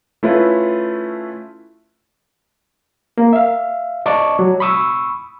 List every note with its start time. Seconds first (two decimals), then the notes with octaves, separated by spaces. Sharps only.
0.23 A3 C#4 E4 F4 B4
3.18 A#3
3.33 E5 F5
4.06 D5 D#5 A5 C#6 D6
4.39 F#3
4.60 B5 C#6 D#6 E6